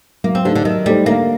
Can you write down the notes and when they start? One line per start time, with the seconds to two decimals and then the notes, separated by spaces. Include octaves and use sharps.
0.24 F#3 A#3
0.35 C4
0.45 D3 A3 D#4 G4 C5
0.55 D3
0.65 D#3 F#3
0.86 G3 A3 D#4 G4 C5
1.06 D3 A#3